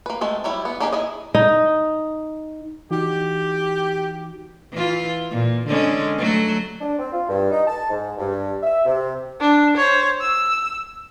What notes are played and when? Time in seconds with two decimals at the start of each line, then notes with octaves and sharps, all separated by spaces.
0.06 A#3 B4
0.21 G#3 A3 C4
0.44 F#3 G3 E4
0.65 B3
0.80 A#3 D4 D#4 G4 G#4
0.93 E4 G#4 D#5
1.35 D#4
2.91 E3 D#4 F#4 G4
4.72 E3 F4
5.31 A#2
5.67 D3 G#3 C#4
6.18 F#3 A3 F#4
6.80 D4
6.99 C4
7.12 F4
7.28 G2
7.51 D#4
7.67 A5
7.90 G#2
8.18 G2
8.63 E5
8.86 C3
9.41 D4
9.77 C5 C#5
10.21 E6